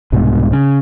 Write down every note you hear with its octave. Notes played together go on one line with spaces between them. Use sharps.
C2 G#2 B2
C#3